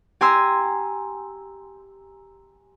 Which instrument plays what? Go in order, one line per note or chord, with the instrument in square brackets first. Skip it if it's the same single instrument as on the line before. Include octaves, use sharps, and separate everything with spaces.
[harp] G4 G#5 A#5 C6 E6